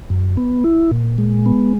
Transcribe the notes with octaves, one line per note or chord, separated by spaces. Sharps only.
F#2
B3
E4
A#2
G#3
B3